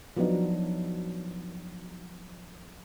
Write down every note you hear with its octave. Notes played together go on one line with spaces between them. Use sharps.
F3 F#3 B3 D4 D#4